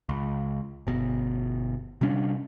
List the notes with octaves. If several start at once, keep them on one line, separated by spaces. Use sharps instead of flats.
C#2
G1 B2
C3 G3 C#4 D4